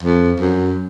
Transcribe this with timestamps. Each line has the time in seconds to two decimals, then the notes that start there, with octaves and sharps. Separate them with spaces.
0.03 F2
0.40 F#2